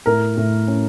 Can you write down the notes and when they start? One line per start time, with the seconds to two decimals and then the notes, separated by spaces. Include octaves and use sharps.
0.06 A2 A#4
0.37 A2
0.68 C#4